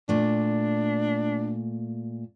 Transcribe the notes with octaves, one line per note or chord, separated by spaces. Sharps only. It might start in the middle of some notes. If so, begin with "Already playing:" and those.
A#2 A3 D4